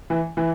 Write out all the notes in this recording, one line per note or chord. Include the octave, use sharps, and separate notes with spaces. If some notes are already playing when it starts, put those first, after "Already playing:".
E3
E3